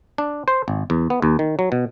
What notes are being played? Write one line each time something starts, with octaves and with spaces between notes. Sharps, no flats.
D4
C5
G#1
E2
B3
D#2
D#3
F#3
B2